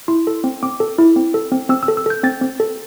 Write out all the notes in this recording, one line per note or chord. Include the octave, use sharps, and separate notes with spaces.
E4 C6
A4
C4
C4 D6
A4
E4
C4
A4
C4
C4 E6
E6
A4
E6
A4 G6
C4 A6
C4
A4